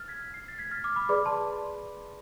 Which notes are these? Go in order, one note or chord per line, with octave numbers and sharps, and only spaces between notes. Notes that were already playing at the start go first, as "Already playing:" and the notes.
Already playing: E6 F6 A6
G#6 B6
C7
A6 C7
G#6 B6
F6 A6
D6 F6
B5 D6
G#4 B4 D5 B5 D6
A5 C6